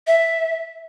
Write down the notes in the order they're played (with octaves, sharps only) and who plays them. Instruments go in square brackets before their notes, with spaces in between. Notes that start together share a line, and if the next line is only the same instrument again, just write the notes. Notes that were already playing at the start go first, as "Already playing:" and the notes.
[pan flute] E5